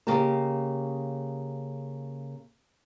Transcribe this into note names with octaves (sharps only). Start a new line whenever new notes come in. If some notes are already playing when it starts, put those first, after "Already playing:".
C#3 A#3 G4 D#5 A5